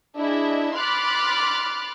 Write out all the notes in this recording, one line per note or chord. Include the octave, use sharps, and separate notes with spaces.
D4 E4 G#4 D#5 E5
B5 C6 D6 F6 F#6 A6